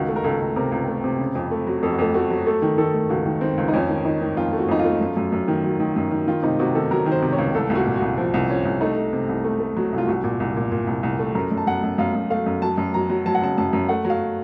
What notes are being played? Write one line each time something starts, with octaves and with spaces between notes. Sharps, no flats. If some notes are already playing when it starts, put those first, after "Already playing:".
Already playing: C#2 D#3 F#4
A3
A#4
C#2 A4
C#2
C3 A#4
C#2
A3
C3
C#3
F2
A3
F#3
F2 A4
F#4
F2 A4
A3 F#4
F#3
A3 A4
D#3
D#3 A4
A3
C#2 F#4
D#3
D#3 C4
C#2
D#4
F2 C#4
D#3
D#3 D#4
D#3
F2 F4
A3
F#4
F2 D#4
F4
A3
F#2
F#2
F#2
D#3
F#3
D#3
F#2
D#3
D#3 F4
C3 D#4
C3 F#4
D#3 A4
F#3 A#4
D#3
C5
C3
C#5
C#2
C2 A4
C2 F4
F#4
A#2
F#4
C2
F3
C2
F3 C#4
C2
A3 D#4
A3
C3
C2
A3
A3
F#3
C2
F4
C2 F#4
A#2
C2
A#2
A#2
C2
C2
A3
F#2 A#4
F#2
A5
F#2 F#5
F#2
F#2 F5
F#2
A3 F5
F#2
F#3 A5
F#2
F#3 A#5
F#3
F#3 A5
F#5
C#3 A5
F#2 A5
F#2
A3 F#5
F#3
F5